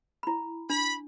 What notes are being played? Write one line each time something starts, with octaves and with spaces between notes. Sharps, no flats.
E4 B5
D4 B5